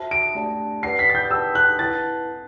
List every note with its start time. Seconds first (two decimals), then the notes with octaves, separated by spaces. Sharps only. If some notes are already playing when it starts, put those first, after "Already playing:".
Already playing: F#4 C5 E5 A5
0.11 D7
0.35 A3 D4 G4 D5 A5
0.83 G4 B4 D5 F#5 C7
0.99 B6
1.09 A6
1.15 G6
1.31 G4 B4 F#5 A5 E6
1.55 F#6
1.79 E4 B4 F#5 A5 A6